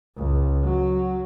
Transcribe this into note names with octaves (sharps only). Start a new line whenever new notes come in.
C#2
F#3